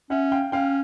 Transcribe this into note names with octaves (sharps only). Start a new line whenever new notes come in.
C#4 E5 F#5
F5 G5
C#4 F5 G5